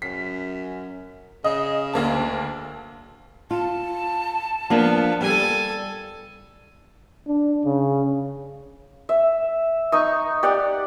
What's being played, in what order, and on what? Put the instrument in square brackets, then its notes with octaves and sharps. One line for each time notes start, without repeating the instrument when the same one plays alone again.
[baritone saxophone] F#2 [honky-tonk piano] B6
[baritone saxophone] C#3 [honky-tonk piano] D#5
[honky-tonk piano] D2 A#3 A5
[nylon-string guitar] F4 [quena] A5
[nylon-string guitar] F3 A#3 D4 [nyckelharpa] B3
[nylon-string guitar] G3 [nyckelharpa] A4 G#5
[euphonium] D4
C#3
[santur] E5
D#4 C#6 D#6
G4 D5 F#5